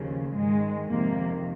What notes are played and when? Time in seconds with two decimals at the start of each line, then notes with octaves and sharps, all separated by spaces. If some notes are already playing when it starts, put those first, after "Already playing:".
Already playing: D#2 C#3 F3
0.34 G#2 D#3 G#3
0.88 F2 C3 D#3 A#3